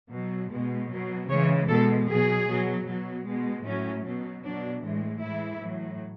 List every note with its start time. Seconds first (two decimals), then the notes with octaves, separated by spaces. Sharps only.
0.11 B2 F#3
0.50 B2 G#3
0.89 B2 F#3
1.28 C#3 E3 G#3 C#5
1.68 B2 G#3 A4
2.07 B2 F#3 G#4
2.47 B2 F#3
2.86 B2 F#3
3.26 B2 G#3
3.64 A2 F#3 C#4
4.05 B2 F#3
4.44 B2 F#3 D4
4.84 A2 E3 G#3
5.22 A2 E3 G#3 E4
5.62 A2 F#3